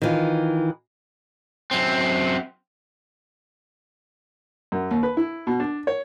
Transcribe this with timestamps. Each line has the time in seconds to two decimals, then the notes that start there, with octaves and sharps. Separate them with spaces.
0.02 D#3 E3 F4
1.71 F#2 C4
4.72 F#2
4.91 D#2
5.03 B4
5.17 E4
5.47 B2
5.60 D4
5.87 C#5